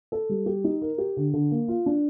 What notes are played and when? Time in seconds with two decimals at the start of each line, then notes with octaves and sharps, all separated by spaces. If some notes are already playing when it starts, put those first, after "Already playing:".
0.12 A4
0.29 G3
0.46 G4
0.64 D#4
0.82 A#4
0.98 G4
1.17 D3
1.34 D3
1.51 A#3
1.68 F4
1.86 D4